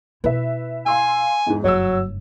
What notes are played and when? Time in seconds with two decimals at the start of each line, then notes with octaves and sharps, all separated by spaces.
0.24 B2 E4 B4 E5
0.86 F5 G#5 C6 E6
1.46 E2 G#2
1.64 F#1 G2 F#3 C#5 E6